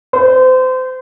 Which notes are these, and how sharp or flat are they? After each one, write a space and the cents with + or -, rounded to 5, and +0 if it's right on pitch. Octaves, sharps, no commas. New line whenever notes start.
C5 -30